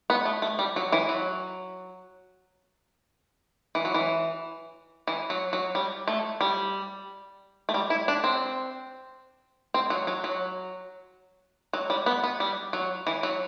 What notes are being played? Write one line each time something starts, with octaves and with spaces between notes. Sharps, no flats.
B3
A3
A3
G3
F#3
E3
F#3
E3
F#3
E3
E3
F#3
F#3
G3
A3
G3
A3
G3
E4
D4
C4
C4
F#3
F#3
F#3
F#3
G3
B3
B3
G3
F#3
E3
F#3